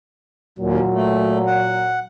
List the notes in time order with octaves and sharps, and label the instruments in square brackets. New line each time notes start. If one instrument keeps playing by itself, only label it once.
[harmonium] D#2 [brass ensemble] A#2 F#3
[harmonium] A3
F#5